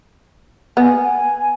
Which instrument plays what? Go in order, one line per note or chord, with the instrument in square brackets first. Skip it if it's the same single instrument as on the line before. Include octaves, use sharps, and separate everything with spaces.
[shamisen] B3 [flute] G#5